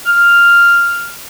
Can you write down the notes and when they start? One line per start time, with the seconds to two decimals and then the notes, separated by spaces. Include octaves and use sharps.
0.06 F6